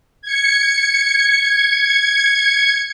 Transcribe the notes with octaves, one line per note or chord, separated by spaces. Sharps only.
G#6 C#7